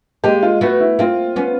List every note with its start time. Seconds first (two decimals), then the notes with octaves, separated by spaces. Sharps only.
0.24 G#3 A#3 G4
0.43 F4
0.61 A3 B3 F#4
0.80 E4
0.99 A#3 C4 F4
1.36 B3 C#4